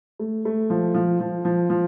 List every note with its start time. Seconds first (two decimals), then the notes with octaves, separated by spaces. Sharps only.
0.19 A3
0.45 A3
0.70 F3
0.95 F3
1.20 F3
1.45 F3
1.70 F3